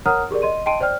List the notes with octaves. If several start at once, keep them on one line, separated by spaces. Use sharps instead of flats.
A#4 C#5 F#5 A#5 D#6 F6
G4 G#4 A#4 D5
D#5 C6 D#7
D#5 G5 A5 C6 D7 D#7
C5 D5 G5 F6